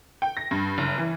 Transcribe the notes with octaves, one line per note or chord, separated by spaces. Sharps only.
G5
A#6
G2
F#1
E3